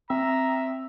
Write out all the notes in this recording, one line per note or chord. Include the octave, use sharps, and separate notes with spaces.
C4 E5 A#5